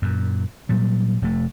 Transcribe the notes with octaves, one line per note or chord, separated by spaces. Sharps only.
F#2 A#2
A#2 F#3 G3
F1 C3 A3